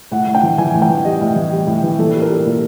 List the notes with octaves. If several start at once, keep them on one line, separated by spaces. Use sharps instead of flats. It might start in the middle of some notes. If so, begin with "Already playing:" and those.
A2 F#5
A2
G5
E3
E3 G#5
A2
G5
E3
G3 D#5
A2
E3
G3
A2
E3
A#2 A4
G3
A#4
G3
A#2